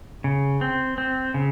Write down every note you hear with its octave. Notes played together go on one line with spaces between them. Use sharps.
C#3
C4
C4
C#3